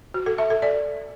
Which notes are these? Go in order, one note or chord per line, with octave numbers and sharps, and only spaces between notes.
F#4
A4
E5
A4
D5